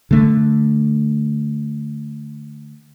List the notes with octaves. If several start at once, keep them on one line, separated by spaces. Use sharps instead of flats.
D3 A3